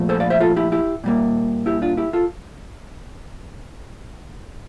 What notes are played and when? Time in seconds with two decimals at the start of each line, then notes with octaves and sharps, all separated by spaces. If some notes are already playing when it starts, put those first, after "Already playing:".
Already playing: A#2 F3 A3
0.09 A4 C5
0.20 D5 F5
0.30 C5 E5
0.41 F4 A4
0.56 E4 G4
0.72 E4 G4
1.04 A#2 G3 A#3
1.66 E4 G4
1.82 D4 F4
1.97 E4 G4
2.13 F4 A4